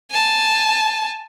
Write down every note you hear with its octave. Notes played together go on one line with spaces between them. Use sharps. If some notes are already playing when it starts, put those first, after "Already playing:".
G#5 A5